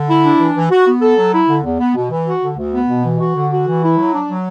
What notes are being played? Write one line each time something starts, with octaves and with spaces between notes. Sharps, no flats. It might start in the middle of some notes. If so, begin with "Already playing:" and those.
Already playing: D3
E4
D4
E3
E3
F#4
B3
A4
F#3
E4
D3
E2
B3
B2
E3
F#4
D3
D2
B3
B2
E3
F#4
D3
F#4
E3
E4
F#3
D4
F#3